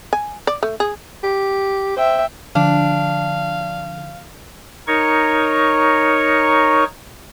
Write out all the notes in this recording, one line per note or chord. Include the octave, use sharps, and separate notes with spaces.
G#5
D5
A3
G#4
G4
C5 E5 G5
D3 F3 D4 F5
D#4 A#4 C#5 C#6